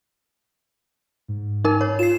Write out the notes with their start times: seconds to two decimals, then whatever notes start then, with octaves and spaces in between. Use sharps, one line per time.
1.28 G#2
1.65 D#4 A#4
1.81 C#5
1.99 F4 C7 E7